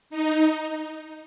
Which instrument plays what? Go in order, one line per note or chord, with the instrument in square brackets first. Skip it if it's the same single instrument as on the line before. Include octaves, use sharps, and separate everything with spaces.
[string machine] D#4